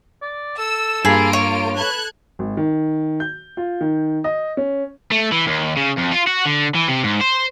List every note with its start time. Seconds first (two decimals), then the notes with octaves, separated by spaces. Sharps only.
0.22 D5
0.58 A4 E6
1.05 G2 A#3 F4 G#4 B5 D7
1.33 C#5
1.78 A4 B4 F#6 G#6
2.39 G#1
2.57 D#3
3.20 G6
3.57 F4
3.81 D#3
4.24 D#5
4.57 C#4
5.12 A3
5.32 E3
5.47 D#2
5.77 C#3
5.98 F2
6.13 F4
6.27 F#4
6.46 D3
6.75 E3
6.88 C3
7.03 G#2
7.21 C5